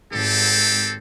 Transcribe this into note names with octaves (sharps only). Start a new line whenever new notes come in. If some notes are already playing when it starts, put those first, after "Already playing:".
G#1 C4 G4 A4